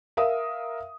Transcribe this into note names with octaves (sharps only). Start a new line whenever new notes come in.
A#4 E5 F5 D#6